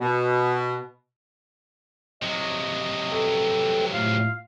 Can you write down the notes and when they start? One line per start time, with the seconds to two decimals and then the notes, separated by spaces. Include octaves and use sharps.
0.01 B2
2.22 C3 F#3 D#5
3.10 A4 B4 G5
3.93 A2 A3 F4 F5